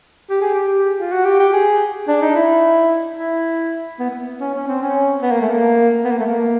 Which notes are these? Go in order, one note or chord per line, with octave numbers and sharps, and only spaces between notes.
G4
G#4
G4
F4
F#4
G4
G4
G#4
D4
D#4
E4
E4
B3
B3
C#4
C#4
C4
C#4
B3
A#3
A3
A#3
B3
A#3
A3
A#3